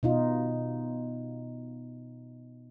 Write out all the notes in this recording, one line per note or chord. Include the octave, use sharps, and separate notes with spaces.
B2 D#4 F4